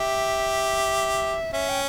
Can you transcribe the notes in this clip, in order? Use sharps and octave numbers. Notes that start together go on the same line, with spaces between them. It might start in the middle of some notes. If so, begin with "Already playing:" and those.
Already playing: G4 E5
C#4 E5
G5